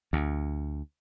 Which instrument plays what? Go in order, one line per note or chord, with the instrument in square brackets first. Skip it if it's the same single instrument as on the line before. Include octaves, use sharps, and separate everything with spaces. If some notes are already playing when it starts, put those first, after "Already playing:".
[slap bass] D2